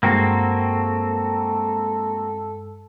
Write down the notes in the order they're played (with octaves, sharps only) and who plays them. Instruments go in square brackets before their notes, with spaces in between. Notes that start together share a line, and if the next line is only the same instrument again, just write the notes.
[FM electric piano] G2 G#3 [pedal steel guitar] A#3 C4 F#4 [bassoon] A4